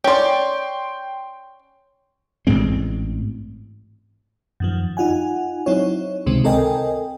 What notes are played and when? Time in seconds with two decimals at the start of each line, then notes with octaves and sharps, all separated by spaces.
0.04 C#4 D5 G5 C6
2.47 A1 G#2 G#3 C4
4.60 F#2 D#3 F3
4.97 D#4 F4 F#5 G#5
5.66 F#3 C4 D#4 E4 C#5
6.26 C#2 C3 D#3 G#3 C4
6.44 C4 A4 A#4 D#5 G5 G#5